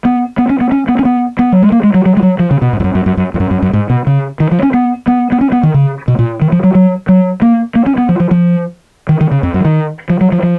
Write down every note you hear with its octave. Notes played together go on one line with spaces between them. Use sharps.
B3
B3
C#4
B3
C#4
B3
C#4
B3
B3
F#3
G#3
A#3
G#3
F#3
F#3
G#3
F#3
F3
C#3
B2
G#2
F2
F#2
F#2
F#2
F#2
F2
F#2
F#2
F#2
G#2
B2
C#3
D#3
F3
C#4
B3
B3
B3
C#4
B3
D#3
C#3
B2
A#2
D#3
F3
F#3
F#3
F#3
A#3
A#3
C#4
B3
F3
F3
F3
D#3
D#3
C#3
F2
F#2
F3
D#3
F3
F#3
F3
F3